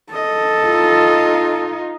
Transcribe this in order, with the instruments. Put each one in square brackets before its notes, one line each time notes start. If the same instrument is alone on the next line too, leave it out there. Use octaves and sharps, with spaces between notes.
[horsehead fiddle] A4 [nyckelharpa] D#5
[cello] D#4 F4